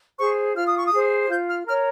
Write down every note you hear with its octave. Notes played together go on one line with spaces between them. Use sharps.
G#4 C5 C#6
F4 F6
D#6
C#6
D#6
G#4 C5
F4 G6
F6
A#4 C#5 F6